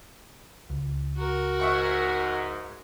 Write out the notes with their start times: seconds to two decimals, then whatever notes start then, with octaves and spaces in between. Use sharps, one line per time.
0.70 C#2
1.17 F#4 A#4
1.60 G#2 E5 F#5 C#6